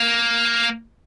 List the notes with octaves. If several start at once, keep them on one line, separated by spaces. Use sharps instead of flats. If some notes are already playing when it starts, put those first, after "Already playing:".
Already playing: A#3